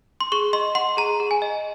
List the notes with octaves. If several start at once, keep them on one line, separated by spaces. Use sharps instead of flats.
C6
G#4 C#6
D#5 C6
F#5 C6
G#4 A#5
G#4
G#5
D#5